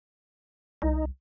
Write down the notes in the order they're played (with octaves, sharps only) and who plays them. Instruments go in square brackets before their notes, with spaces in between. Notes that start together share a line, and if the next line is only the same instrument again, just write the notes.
[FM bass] C2 [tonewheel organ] D#4